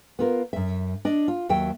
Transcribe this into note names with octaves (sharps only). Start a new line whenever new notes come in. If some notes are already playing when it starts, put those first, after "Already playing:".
B3 F4 A#4
F#2 E5
D4 D#5
F4
D#2 F#3 E5 G5